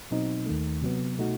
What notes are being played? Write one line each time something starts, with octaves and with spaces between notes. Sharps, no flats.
B2 F#3 C4 D#4
D#2 D#3 A3
C3 F#3 B3
B2 A3 D#4 F#4